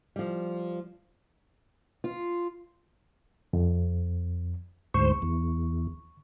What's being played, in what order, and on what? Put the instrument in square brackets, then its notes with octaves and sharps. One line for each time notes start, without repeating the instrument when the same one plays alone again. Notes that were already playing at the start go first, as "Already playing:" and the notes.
[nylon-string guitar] F3 G3
[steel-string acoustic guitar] F4
[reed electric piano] F2
[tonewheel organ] D2 G#2 C5 [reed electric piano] C#6
[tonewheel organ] E2